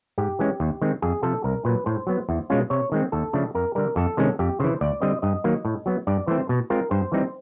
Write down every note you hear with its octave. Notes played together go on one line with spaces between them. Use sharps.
G#2 G4
E3 G#3 C#4
D#2
D#3 G#3 C4
F2 G#4
C3 F3 A4
C2 A#4
A#2 F#3 B4
A2 C5
F#3 B3
E2
B2 G#3 C#4 F4
C3 C#5
D#3 G#3 C4
D#2 A4
C#3 F3 A3 D4
F2 A#4
D3 G3 A#4
F2 A4
C3 D#3 G#3 C#4
F2 G4
C#3 E3 C5
D2 D5
D3 G3 C4 D#5
G2 D#5
D#3 F#3 A#3
A2
F#3 B3
G2 D5
E3 A3 C4 C5
B2
G#3 C4 F4 A#4
G2 C5
E3 G3 C4 D#4